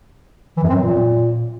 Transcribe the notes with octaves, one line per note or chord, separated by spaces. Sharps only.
E3
F#2
C4
F#3
A#2